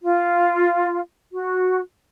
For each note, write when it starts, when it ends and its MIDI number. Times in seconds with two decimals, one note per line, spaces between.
0.03 1.00 65
1.32 1.80 66